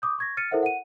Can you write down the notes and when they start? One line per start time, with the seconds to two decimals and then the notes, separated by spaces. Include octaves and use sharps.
0.02 D6 D#6 G6
0.18 C#6 G#6 A#6
0.37 F6 A6 C#7 D#7
0.51 E4 A4 A#4 C5 E5 F#5
0.63 F#5 D#7